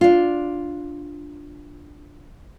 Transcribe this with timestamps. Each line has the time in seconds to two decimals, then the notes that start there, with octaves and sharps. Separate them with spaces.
0.01 D4 F4